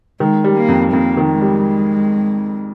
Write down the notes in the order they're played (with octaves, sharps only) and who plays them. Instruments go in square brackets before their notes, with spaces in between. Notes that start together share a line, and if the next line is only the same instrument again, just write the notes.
[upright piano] D#3 [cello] G#3
[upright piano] G3
[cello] A#3
[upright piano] F2
[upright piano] F2 [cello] A#3
[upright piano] D#3
[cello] G#3
[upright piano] G3